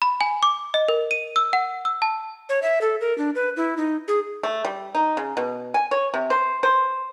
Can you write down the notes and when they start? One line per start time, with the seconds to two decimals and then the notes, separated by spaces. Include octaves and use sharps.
0.02 B5
0.21 G#5
0.43 D6
0.74 D#5
0.88 A#4
1.11 D#7
1.36 E6
1.53 F#5
1.85 E6
2.02 A5
2.49 C#5
2.62 E5
2.81 A4
3.01 A#4
3.18 D4
3.35 B4
3.57 E4
3.77 D#4
4.08 G#4
4.43 A3
4.65 G3
4.95 D#4
5.17 C#3
5.37 B2
5.74 G#5
5.91 C#5
6.14 C3
6.30 C5
6.63 C5